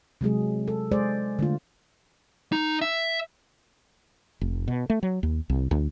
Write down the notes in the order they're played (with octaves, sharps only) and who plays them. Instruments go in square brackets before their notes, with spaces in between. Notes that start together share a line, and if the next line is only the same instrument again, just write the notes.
[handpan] C3 F#3 G#3 G#4
A4
G#3 G#4 C5 D5
D3 A3 F4
[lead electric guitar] D#4
E5
[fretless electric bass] F1
B2
A3
F#3
D#2
C2
D2